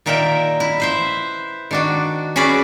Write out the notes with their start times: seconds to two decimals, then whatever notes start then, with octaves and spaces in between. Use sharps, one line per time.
0.06 A#2 D#3 A#4 E5 G5
0.60 E4
0.80 B4 C5 E5
1.71 D#3 D4 F#4
2.36 C#4 F#4 G#4 B4 D5